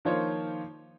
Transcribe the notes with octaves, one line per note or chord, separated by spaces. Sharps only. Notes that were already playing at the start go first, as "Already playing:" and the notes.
D#3 F3 A#3 F4 C5 C#5